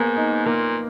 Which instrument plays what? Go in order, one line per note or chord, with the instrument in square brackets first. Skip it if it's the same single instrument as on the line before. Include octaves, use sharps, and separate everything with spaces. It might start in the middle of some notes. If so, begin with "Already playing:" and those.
Already playing: [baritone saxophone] G#2 [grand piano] A#3 B3
[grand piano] D#4
[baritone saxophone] A#2 [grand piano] A#3